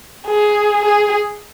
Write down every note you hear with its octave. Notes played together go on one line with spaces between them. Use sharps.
G#4
G#4